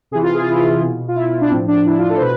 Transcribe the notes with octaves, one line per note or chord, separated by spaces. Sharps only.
C3 E3 G#4
F4
G#4
F4
E4
F4
B2
F4
E4
D4
A2 F3 C4
D4
E4
F4
A4
C5
B2 B4